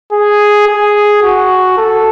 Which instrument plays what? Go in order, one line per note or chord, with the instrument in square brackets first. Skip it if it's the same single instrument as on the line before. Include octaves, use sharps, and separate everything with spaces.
[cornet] G#4
G#4
F#4
A4